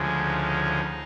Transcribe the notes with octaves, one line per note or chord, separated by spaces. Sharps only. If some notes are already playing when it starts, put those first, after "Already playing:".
Already playing: D2 C#3 F3 G#3
D#4